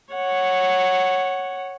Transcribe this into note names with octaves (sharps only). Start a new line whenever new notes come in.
C#5 F#5